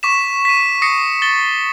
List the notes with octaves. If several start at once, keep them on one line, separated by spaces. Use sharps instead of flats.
C#6 D6 B6 E7
B6 D#7
D#6 A#6 C7 C#7
A6 G7